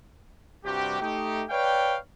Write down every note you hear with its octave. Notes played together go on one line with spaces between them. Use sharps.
G2 C3 G3 F#4 G4
A3 D#4 G4
B4 C#5 D5 F5 G5